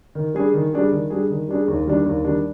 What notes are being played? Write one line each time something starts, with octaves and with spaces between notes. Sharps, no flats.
D#3
G3 D4 G#4
D#3
G3 D4 G#4
D#3
G3 D4 G#4
D#3
G3 D4 G#4
D#2
D#3 G3 D4
D#2
D#3 G3 D4